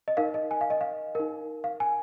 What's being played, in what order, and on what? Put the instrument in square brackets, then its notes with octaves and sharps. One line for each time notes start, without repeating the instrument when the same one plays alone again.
[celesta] D#5
D#4 A#4 F5
D#5
G#5
F5
D#5
F5
D#4 A#4
F5
G#5